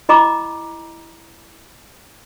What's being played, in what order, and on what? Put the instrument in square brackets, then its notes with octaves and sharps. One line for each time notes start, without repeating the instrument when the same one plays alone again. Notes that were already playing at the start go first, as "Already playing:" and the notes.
[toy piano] E4 D#5 A#5 B5 D6